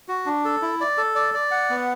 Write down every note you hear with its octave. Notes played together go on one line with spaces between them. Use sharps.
F#4
D4
A4
E4
D5
A4
D5
D5
F#5
B3